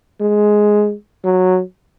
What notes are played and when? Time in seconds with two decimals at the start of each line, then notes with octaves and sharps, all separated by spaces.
0.21 G#3
1.24 F#3